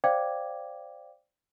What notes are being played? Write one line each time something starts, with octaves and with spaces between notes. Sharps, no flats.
C5 D5 F5 G5 D6 G#6